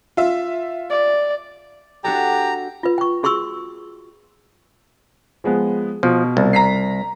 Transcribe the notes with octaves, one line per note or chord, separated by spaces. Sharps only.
F4 E5
D5
D4 F#4 G4 A4 A#5
F4 B4
G5 C#6
F#4 G#4 C6 C#6 E6
F3 G#3 B3
B2 F3
C2
A#5 B6 C7